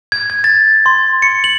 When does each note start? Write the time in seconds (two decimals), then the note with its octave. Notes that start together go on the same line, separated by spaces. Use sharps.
0.12 G#6
0.30 G#6
0.44 A6
0.86 C6
1.22 C#7
1.44 F#7